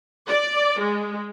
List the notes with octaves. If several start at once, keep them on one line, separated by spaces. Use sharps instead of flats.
D5
G#3